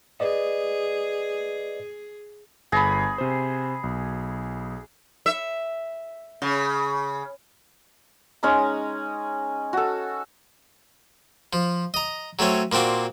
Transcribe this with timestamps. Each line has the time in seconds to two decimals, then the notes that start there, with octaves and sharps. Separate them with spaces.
0.20 G#4 B4 D5 D#5
2.72 G1 G#4 B5 A#6
3.18 C3 C5
3.84 B1
5.26 E5
6.42 C#3
8.43 G#3 C#4 D#4 A#5
9.73 F#4 A4
11.53 F3
11.94 D#5 A#5
12.39 F#3 A3 C4 C#4
12.72 A#2 A#3 C4 D4 F#4